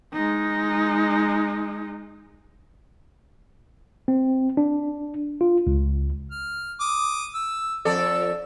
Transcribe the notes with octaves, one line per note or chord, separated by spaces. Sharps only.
G#3 D#4
C4
D4
F4
C#2
F6
D6 D#6
E6
F2 A4 D5 E6